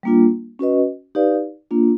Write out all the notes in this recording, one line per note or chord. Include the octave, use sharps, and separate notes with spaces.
G3 A#3 D4 F4
C#4 F#4 B4 D#5
D#4 G4 B4 D5 F5
A#3 D4 F4